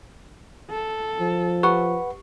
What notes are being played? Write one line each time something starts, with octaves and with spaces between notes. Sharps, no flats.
A4
F3
G4 B4 F#5 C#6